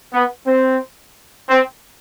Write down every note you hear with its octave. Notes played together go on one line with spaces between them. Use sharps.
B3
C4
C4